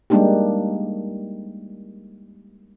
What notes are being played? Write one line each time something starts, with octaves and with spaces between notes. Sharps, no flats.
G3 G#3 A#3 D4 D#4 G4